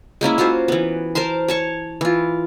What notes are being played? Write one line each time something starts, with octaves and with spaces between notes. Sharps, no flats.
G#3 A#3 C#4 E4
C#4 F4 F#4 C5
E3 B3
A#4 C5 A5 C6
C#5 A5 C#6
E3 F4